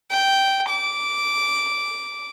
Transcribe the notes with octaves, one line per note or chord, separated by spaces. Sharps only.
G5
D6